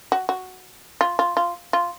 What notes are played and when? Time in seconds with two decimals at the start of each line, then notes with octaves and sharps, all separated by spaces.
0.12 F#4
0.29 F#4
1.01 F4
1.19 F4
1.37 F4
1.73 F4